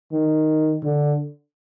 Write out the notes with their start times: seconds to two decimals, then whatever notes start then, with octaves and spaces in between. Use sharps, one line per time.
0.12 D#3
0.83 D3